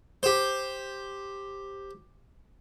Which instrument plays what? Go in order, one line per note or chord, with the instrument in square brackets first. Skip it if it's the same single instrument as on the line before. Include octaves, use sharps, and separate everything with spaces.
[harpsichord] G4 C5